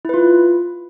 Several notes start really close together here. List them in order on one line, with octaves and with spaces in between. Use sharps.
E4 B4 F4